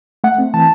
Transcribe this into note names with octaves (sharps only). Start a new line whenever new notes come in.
A3 F#5
C4
E3 A5